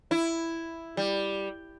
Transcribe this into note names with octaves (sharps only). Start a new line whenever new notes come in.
E4
G3